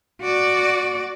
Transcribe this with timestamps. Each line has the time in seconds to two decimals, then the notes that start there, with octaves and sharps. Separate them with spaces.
0.21 F#4 D5